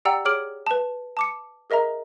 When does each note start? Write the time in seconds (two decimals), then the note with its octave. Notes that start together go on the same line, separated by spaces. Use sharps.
0.05 G4 D5 F#5 G5 A#5 E6
0.25 G#4 C#5 D6 F6 D7 F#7
0.66 B4 A5
1.17 A5 D6 C#7
1.70 G#4 A#4 D#5 E5 A#5